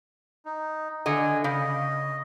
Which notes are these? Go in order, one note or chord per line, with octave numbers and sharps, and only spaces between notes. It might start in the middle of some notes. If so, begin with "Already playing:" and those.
D#4
D3 D#5 G#5
C#3 D#5